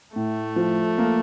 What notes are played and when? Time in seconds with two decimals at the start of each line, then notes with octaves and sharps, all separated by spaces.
0.16 A2 A3
0.56 F3
0.98 A#3